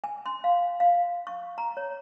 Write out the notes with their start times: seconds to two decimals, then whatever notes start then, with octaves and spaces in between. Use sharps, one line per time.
0.04 G#5
0.26 C6
0.44 F5
0.80 F5
1.27 C#6
1.58 A#5
1.77 C#5